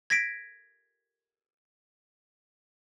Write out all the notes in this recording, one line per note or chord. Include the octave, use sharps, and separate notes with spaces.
G#6 A#6 B6 D7